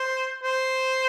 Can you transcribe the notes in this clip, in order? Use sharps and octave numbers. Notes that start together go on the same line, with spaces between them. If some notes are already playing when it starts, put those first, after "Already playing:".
Already playing: C5
C5